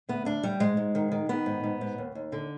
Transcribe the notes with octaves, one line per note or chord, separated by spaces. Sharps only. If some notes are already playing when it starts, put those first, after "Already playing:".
D2 B3
D2 D4
D2 G3
G#2 G#3
G#2
D#3
D#3
D#3 B3
G#2
G#2
G#2
D#2
D#2
D3